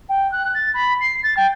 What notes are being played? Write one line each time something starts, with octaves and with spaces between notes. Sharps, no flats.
G5
F#6
A6
B5
C7
A6
G5